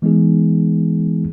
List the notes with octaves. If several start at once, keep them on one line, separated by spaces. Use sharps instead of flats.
E3 G#3 B3 D#4 G#4